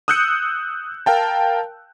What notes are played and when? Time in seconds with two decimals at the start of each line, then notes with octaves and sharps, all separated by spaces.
0.08 D#6 E6 F#6 G6 C#7
1.06 A#4 F5 G5 A5